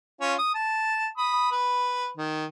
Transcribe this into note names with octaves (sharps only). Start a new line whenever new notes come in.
C#4 F4
D#6
A5
B5 D#6
B4
D#3